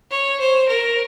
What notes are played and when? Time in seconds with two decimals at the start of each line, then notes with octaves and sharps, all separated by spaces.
0.11 C#5
0.40 C5
0.68 A#4